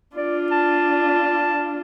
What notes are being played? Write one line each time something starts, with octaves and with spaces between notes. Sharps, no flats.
D4 F4 D5
A5